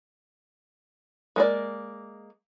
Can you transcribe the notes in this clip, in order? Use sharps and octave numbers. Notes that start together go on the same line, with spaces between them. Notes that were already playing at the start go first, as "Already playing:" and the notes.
G#3 A#3 D5